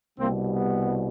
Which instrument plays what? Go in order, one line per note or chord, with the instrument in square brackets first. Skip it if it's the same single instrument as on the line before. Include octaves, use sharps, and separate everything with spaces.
[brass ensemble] C2 B2 G3 A#3 C4
B3